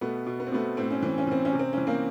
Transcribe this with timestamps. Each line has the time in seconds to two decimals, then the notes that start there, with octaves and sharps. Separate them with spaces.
0.01 B2 A3 B3
0.26 B2
0.40 B3
0.47 C4
0.52 B2 A3 B3
0.77 A2 C4
0.91 C#4
1.02 E3 C4
1.18 C#4
1.27 E3 C4
1.45 C#4
1.53 C3
1.59 C4
1.73 E3 C#4
1.87 A#3 C4